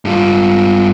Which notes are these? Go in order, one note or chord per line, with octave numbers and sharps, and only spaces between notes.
G2 F4